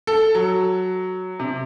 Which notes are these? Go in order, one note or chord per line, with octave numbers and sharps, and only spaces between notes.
A4
F#3
C3